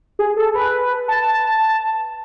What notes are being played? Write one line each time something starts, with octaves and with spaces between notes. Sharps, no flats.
G#4
A4
B4
A5